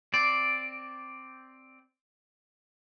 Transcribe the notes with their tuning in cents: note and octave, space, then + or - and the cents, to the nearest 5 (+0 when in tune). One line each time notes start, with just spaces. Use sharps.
C4 +0 D5 +0